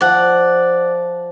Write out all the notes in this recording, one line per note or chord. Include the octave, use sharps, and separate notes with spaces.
F3 D5 F#5